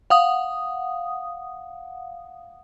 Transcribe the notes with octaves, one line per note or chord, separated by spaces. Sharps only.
F5 F#5 D#6